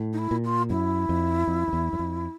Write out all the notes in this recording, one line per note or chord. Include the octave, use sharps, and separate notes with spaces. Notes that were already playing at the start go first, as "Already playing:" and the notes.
Already playing: A2
D#4
E4
A#2
F4
F#2 E4
F2
F2
F2
E2
F#2
F2